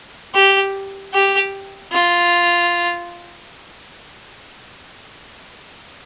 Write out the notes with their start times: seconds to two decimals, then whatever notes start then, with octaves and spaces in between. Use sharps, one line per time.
0.34 G4
1.13 G4
1.92 F4